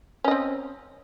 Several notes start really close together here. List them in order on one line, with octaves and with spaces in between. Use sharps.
C#4 D#5 C4